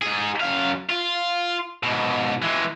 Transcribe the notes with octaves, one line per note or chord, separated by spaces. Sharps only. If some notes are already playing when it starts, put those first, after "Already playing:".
G#2 G#4
F#2 F5
F4
G#2 B2
E3 G#3